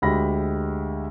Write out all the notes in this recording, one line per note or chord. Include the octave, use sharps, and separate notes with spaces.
D2 G#3 G4 B5 A#6